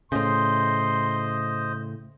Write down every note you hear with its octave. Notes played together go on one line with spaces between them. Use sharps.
A2 C#3 C5 D#5 C6